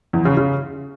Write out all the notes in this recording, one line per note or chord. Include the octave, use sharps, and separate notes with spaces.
E2
C#3
C#3